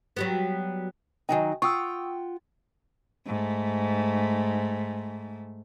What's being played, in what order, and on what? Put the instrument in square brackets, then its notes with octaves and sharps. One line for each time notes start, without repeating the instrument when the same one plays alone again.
[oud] F#3 G3 B3
[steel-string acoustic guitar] D#3 F#3 D#4 [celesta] G5 G#5
[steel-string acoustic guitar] F4 F#5 G5 [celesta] C#6 D#6 E6
[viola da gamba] G#2 A3